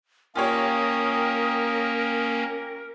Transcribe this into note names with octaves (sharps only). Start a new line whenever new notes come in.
A#3 C#4 F4 G4 A#4 C#5 D#6